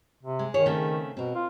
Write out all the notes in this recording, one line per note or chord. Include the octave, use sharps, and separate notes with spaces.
C3
G#3
D#3 E4 G#4 C#5
C#3 A3 C4
B2 C4 A#4
F4